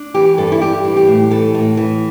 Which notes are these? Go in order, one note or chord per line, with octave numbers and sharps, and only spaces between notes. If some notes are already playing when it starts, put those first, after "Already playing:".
Already playing: D4
E3 G4
G2 A4
E4
G3 G4
E3
G4
A2
E3 A4
A2
E3